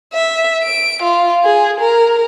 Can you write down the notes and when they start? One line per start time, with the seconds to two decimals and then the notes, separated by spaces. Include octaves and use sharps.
0.14 E5
0.63 D7
1.02 F4
1.44 G#4
1.80 A#4